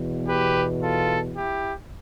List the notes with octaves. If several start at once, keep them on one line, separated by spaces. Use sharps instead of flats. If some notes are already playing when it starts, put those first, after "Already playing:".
Already playing: E2 B2
G4 B4
F4 A4
E4 G4